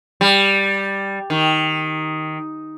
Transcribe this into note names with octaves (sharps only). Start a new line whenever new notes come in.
G3
D#3